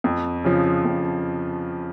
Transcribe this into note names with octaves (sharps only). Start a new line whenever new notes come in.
F2
C#3 F3
F2